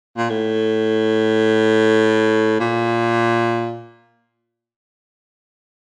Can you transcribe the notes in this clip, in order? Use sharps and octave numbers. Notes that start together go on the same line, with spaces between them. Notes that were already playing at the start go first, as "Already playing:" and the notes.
A#2
A2
A#2